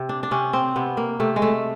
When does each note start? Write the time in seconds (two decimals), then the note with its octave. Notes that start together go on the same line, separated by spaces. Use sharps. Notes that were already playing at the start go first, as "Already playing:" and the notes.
Already playing: C3
0.09 D4
0.23 D4
0.31 C3 C#4
0.53 C4
0.76 C3 B3
0.97 A#3
1.20 C3 A3
1.36 G#3
1.42 A3